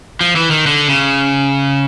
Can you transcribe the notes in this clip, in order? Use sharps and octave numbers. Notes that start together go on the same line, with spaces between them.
F3
E3
D#3
D3
C#3